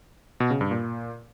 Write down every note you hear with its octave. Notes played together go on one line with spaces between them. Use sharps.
B2
C#3
G2
A#2